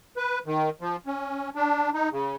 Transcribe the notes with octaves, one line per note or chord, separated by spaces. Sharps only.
B4
D#3
F3
C#4
D4
D#4
C#3